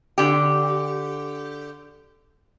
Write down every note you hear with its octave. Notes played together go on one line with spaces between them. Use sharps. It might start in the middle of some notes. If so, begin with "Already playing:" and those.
D3 G4